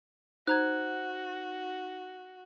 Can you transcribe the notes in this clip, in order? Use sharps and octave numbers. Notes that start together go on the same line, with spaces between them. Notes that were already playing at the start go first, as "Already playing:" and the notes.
D#4 F#4 C5 A#5 F#6 G#6